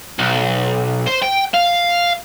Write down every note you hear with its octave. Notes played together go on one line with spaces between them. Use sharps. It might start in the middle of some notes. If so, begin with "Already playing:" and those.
B1
C5
G5
F5